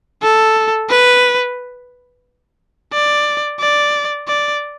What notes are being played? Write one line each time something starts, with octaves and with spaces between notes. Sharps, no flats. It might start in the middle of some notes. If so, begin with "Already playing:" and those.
A4
B4
D5
D5
D5